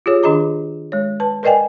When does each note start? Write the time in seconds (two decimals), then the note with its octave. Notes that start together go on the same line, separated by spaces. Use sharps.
0.06 F4 G4 G#4 C#5
0.23 D#3 D4 G#4 D#5 A#5 D6
0.92 G#3 C#5
1.20 B4 A5
1.43 A#4 B4 D5 D#5 G5 G#5